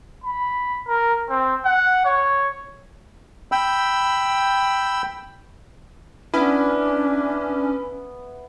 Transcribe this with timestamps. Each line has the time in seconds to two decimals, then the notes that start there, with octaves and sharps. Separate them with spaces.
0.24 B5
0.88 A#4
1.30 C4
1.65 F#5
2.06 C#5
3.52 G5 B5 E6
6.34 B3 C#4 D4 E4 E5